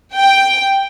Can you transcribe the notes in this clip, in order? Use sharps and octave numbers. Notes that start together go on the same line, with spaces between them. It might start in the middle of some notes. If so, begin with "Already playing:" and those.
G5